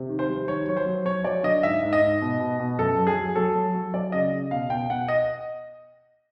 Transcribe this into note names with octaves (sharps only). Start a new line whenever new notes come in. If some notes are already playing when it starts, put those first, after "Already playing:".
Already playing: C3
D#3
C5
G3
D#3 C#5
F#3 C#5
C5
F#3
F#3 C#5
F#3 D5
D3 D#5
G#2 E5
G#2
D#5
G#2
B2
B2
B2
F#2 A4
F#3
G#4
F#3
F#3 A4
F#3
F#3
F#3 D5
C#3 D#5
C#3
B2 F5
B2 G5
B2 F#5
D#5